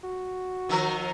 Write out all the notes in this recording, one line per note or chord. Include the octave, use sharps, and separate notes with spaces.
F#4
D#3 F3 A#4